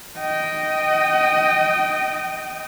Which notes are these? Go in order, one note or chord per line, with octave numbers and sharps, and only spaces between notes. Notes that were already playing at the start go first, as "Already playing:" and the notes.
D#5 G5